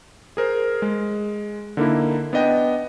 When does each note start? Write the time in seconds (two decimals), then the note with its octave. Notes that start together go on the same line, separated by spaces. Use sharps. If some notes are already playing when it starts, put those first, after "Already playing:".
0.37 G#4 A#4 C5
0.82 G#3
1.77 D3 A#3 D#4 E4
2.33 B3 D4 D#5 G5